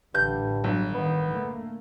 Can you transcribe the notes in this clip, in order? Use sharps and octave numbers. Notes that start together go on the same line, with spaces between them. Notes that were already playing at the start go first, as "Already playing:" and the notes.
A1 G2 D3 G6
G1 F#3
D#3 B3
D3 A3 A#3